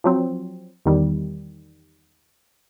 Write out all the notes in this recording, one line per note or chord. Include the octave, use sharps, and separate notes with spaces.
F3 F#3 C4
E2 D#3 G3